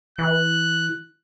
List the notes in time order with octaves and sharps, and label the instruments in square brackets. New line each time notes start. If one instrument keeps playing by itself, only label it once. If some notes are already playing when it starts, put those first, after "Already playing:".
[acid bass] E3 [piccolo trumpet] F#6